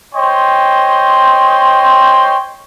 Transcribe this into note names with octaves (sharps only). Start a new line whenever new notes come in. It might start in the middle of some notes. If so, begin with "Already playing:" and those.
C5 C#5 D#5 G5 C6